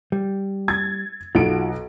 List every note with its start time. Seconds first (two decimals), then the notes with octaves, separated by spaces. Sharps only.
0.12 G3
0.68 G#6 A6
1.35 B1 F4 F#4 D7